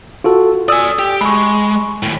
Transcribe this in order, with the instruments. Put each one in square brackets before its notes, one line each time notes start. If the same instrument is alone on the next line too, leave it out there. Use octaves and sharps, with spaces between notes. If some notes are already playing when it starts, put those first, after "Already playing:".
[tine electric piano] F4 F#4 A4
[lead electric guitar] D5 G#5 [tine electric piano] D#6 E6
[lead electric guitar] G4
[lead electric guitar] G#3 [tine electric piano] B5 C#6
[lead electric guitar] D#2 A2